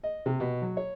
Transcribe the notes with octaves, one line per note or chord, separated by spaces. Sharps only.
D#5
C3
B2
F#3
C#5